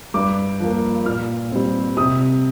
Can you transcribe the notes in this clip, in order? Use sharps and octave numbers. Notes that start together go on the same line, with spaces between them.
G2 D6
F3 A#3
A#2 F6
G3 C4
C3 D#6